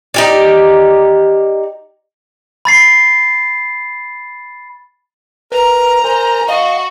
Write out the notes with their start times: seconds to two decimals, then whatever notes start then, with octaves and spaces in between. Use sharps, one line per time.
0.14 D#4 G4 D5
2.65 B5 A6 C7
5.52 A#4 B4 A#5
6.04 A#4 C5 G#5
6.49 F#4 D#5 F5